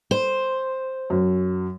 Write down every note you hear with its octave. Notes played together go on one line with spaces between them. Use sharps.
C5
F#2